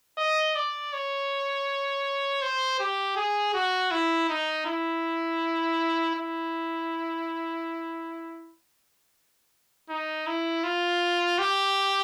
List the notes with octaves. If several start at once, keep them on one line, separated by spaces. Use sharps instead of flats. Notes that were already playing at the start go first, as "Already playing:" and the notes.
D#5
D5
C#5
C5
G4
G#4
F#4
E4
D#4
E4
E4
D#4
E4
F4
G4